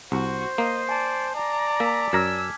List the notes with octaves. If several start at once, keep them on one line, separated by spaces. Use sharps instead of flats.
C2 F#4 C5
A#3 D#5 C7
D5 G#5 A5
D5 A#5
A#3 G#5 E6 B6
F#2 A#5 D6 E6 F6 G#6